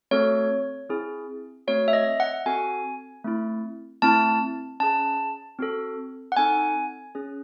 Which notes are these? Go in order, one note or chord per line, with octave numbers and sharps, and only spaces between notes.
A3 C4 F#4 A4 C#5
C4 E4 G#4
A3 C4 F#4 C#5
E5
D#5
F#5
C4 F#4 A4 G#5
A3 C4 E4
A3 C4 E4 A5
C#4 G#4 A5
C4 F#4 A4
F#5
C4 D#4 A4 G#5
C#4 G#4